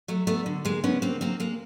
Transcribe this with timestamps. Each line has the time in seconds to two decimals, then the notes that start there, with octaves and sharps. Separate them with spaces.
0.08 F#3 A3
0.27 A3 B3
0.46 D3
0.65 G#3 A#3
0.84 D3 B3 C#4
1.02 A#3 C4
1.21 F#3 A#3 C4
1.40 G#3 A#3